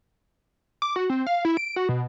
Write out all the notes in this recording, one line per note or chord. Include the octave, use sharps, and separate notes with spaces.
D6
F#4
C4
F5
E4
D7
F#4
B2